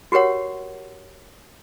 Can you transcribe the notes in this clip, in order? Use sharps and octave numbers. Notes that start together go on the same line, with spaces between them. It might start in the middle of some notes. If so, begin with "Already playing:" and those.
F#4 G4 A#4 C#5 F#5